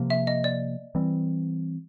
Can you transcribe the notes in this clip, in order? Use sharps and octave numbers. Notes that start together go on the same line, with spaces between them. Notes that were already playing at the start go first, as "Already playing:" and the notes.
Already playing: C3 F3 A#3
E5
D#5
D5
E3 G3 C4